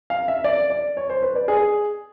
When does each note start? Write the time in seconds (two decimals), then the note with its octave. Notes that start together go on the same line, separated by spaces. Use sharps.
0.10 F5
0.28 E5
0.44 D5
0.70 D5
0.97 C#5
1.10 C5
1.23 B4
1.35 D5
1.48 G#4